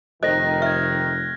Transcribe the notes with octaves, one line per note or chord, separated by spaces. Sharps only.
F1 D#3 A4 C5 D#5 F#6 A#6
E5 F6 G#6